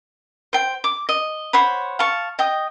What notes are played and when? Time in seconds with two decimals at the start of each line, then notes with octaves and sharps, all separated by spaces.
0.53 C5 G5
0.84 D6
1.09 D#5
1.53 C5 C#5 F#5 B5
1.99 F5 A5 C#6
2.39 D#5 G5 D#6